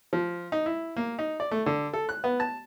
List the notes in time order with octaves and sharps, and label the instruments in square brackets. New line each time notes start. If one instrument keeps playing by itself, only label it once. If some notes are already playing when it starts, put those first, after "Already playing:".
[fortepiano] F3
D#4
E4
A#3
D#4
D5
A3
D3
A4
F#6
B3
A5